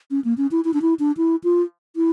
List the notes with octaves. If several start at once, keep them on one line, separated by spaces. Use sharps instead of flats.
C#4
A#3
C#4
E4
E4
D4
E4
D4
E4
F4
E4